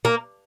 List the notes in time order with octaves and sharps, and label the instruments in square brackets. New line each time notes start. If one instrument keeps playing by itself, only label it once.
[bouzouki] A#3